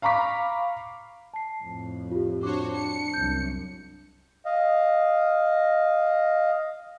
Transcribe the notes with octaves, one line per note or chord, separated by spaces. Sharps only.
F5 A#5 B5 C#6 D6 B6
A5 C7
F2 A2
F4 G4
D4 F#4 C5 C#5 D6
C#7
C2 F#2 G6
D#5 F5